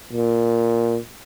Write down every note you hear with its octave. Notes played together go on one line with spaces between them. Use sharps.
A#2